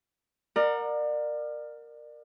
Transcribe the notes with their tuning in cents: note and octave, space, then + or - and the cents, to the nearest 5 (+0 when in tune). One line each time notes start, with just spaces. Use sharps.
A#4 +0 D5 +30 F#5 -30